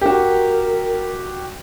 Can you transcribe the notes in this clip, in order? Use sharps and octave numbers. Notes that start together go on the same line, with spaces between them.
F#4 G4 A#4